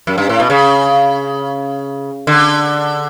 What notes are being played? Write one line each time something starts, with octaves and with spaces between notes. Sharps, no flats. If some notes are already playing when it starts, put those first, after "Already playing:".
F#2
G2
A2
B2
C#3
D3